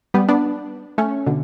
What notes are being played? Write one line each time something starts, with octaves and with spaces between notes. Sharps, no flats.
G3 B3
B3 D4
A3 C#4
B2 D3